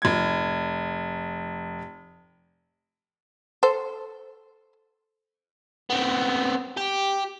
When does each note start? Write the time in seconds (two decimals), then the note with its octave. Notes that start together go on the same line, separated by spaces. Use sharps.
0.02 F1 G#6
3.63 A4 C5
5.90 B3 C4
6.77 G4